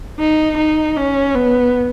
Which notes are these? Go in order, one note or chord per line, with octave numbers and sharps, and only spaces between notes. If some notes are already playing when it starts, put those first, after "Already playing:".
D#4
D#4
C#4
B3